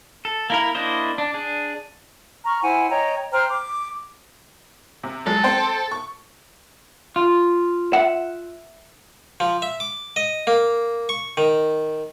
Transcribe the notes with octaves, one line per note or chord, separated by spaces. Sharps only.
A4
A#3 E4 A#4
A#3 D4 E4 C5 D#5
D4
D4 G#4
A#5 C#6 F6
E4 C5 F#5 G#5
C#5 D#5 G5 A#5
C5 G5 A#5 F6
D6
C3
F#3 G#3 A4
C4 C5 G5
C#6
F4
E5 F#5
F3
E5
D6
D#5
A#3
C#6
D#3